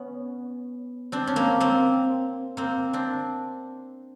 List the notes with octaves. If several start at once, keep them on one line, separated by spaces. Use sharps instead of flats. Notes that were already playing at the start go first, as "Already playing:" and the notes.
Already playing: B3 C#4
C4 D4
C#4
A#3 C4
A#3 C4
A#3 C4
C4 D4